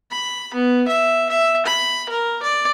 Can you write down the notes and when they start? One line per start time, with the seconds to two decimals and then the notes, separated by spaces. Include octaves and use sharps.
0.11 B5
0.54 B3
0.88 E5
1.29 E5
1.66 B5
2.09 A#4
2.42 D5